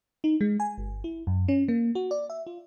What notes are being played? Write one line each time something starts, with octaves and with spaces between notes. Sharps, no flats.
D#4
G#3
G#5
G1
E4
F#2
C#4
A#3
F#4
D5
E5
F4